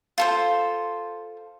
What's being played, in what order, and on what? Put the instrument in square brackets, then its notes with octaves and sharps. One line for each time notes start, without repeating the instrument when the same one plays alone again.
[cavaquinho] F4 A4 C5